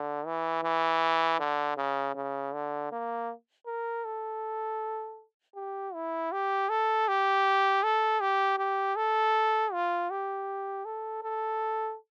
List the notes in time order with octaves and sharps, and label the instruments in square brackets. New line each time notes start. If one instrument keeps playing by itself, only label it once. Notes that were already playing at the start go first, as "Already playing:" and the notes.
Already playing: [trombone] D3
E3
E3
D3
C#3
C#3
D3
A#3
A#4
A4
G4
E4
G4
A4
G4
A4
G4
G4
A4
F4
G4
A4
A4